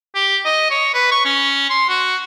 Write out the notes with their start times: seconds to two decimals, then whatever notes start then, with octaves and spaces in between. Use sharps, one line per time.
0.15 G4
0.45 D#5
0.70 C#5
0.94 B4
1.11 C#6
1.25 C#4
1.70 C6
1.89 F#4